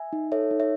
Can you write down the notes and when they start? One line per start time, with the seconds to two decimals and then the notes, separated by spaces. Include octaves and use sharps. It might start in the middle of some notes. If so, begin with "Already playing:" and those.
Already playing: E5 G#5
0.13 D#4
0.32 A4 C#5 E5
0.51 D#4
0.60 C#5 E5